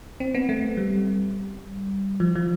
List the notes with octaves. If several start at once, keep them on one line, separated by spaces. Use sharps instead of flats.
C4
B3
A3
G3
F3
F3